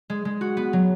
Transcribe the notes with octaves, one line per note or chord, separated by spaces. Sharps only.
G#3
G#3
F#4
B3
F#3